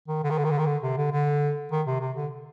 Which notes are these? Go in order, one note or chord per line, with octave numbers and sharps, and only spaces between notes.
D#3
D3
D#3
D3
D#3
D3
D#3
D3
C3
D3
D3
D#3
C3
C3
D3